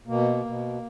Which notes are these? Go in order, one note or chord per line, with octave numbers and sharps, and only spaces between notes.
B2 A#3
B2